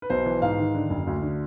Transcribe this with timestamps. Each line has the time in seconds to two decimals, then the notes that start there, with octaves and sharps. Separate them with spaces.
0.02 B4
0.10 B1 C5
0.26 E3
0.42 G#2 F5
0.58 D#3
0.75 D3
0.90 F#1
1.07 D2
1.22 D3